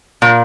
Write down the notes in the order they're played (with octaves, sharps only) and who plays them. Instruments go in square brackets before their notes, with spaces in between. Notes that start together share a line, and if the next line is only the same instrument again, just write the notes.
[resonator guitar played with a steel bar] A#2